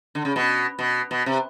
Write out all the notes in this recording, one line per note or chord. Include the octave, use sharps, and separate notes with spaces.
D3
C#3
B2
B2
B2
C3